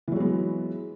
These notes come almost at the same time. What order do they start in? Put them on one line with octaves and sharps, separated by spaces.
E3 F#3 G#3 B3